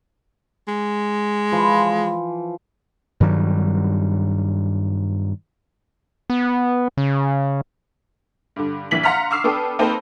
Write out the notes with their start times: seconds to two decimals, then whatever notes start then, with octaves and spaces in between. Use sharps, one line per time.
0.68 G#3
1.52 E3 F3 C5
3.20 G2 D#3 F#3 G3
6.30 B3
6.97 C#3
8.56 G2 D3
8.91 A#1 E3 B6 F#7
9.04 F5 F#5 A#5 C6 F6 B6
9.31 C#6 D6 E6 F6 C7
9.44 B3 D4 A4 G5
9.79 A#3 C4 D#4 A4 B4 C5